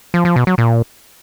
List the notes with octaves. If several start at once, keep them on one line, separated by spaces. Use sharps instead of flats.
F3
F3
B2
F#3
A#2